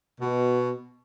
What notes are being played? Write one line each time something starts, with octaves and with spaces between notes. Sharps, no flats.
B2